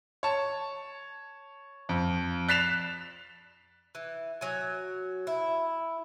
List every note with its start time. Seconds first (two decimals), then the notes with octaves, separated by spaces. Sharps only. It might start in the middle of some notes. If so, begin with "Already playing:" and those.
0.23 C#5 A5
1.89 F2
2.49 F#6 A6 B6 C7 E7 F7
3.95 E3
4.41 F#3 G#5
5.27 E4